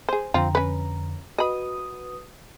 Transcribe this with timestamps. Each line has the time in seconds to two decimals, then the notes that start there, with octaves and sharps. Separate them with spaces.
0.09 G#4 C5
0.34 F2 D3 C4 F4 A#5
0.55 C#4 B4
1.38 F#4 B4 D#5 B5 D#6